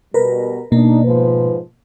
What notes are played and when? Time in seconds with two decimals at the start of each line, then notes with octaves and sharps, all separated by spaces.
0.14 B2 G3 A#4 B4
0.72 B2 A#3 D4 D#4
1.05 G#2 F3 B4